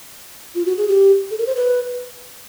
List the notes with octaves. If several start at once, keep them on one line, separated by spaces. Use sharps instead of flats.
F4
F#4
G#4
G4
A4
A#4
C5
B4